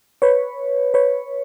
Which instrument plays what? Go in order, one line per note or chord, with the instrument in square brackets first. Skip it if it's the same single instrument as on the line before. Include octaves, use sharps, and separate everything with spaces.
[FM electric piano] B4 C#5
B4 C#5